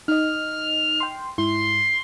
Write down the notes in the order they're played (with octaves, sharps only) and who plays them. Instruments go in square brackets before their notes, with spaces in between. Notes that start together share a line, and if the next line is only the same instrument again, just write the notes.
[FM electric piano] D#4 D#5 [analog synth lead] F6
[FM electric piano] G5 C6
[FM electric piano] G#2 E4 [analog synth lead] C6